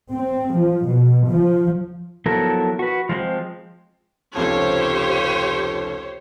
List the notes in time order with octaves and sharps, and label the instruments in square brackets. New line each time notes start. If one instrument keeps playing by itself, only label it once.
[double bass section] C4
F3
B2
F3
[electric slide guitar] F3 F#3 B3 E4 A4 A#4
F#4 B4
F3 G#3 A3 C4
[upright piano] F1 C#2 F3 [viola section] G4 C5 C#5